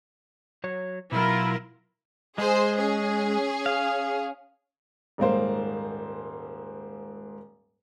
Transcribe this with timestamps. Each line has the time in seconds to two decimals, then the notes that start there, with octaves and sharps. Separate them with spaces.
0.64 F#3 C#5
1.12 B2 F#3 E4 F4 A#4
2.38 G#3 G#4 C5
2.77 C#4 G#4
3.66 F5
5.18 D#1 G#2 A#3 C5